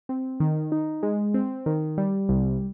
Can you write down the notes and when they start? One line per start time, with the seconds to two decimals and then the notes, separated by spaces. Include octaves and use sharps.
0.09 C4
0.40 D#3
0.72 D#4
1.03 G#3
1.34 C4
1.66 D#3
1.98 G3
2.29 C2